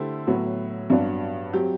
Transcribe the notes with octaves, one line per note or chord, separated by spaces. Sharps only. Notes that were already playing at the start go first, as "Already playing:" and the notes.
Already playing: D3 A3 E4 G4 C5
A2 F#3 B3
G2 F#3 B3 D4 F#4
F#3 C4 G4